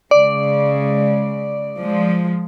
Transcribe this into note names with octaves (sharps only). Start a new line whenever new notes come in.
C#3 G#3 D5
F3 G#3